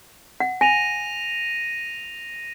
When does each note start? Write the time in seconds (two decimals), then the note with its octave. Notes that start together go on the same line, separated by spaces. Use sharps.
0.40 F#5
0.61 G#5 A#6 D#7 F7